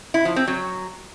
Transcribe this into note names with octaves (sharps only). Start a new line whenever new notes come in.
E4
F3
C4
F#3